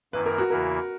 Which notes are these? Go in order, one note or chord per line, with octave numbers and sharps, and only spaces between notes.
F#2 D#3 A#3 E4 B4
A#4
F#4
E2 C#3 E3 A#3 E4 A#4